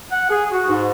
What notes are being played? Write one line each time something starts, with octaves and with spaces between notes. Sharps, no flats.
F#5
G#4
F#4
G#2